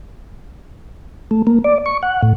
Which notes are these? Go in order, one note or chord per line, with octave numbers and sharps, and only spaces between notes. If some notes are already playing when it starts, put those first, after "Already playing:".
A3
A#3
D5
C#6
F#5
A2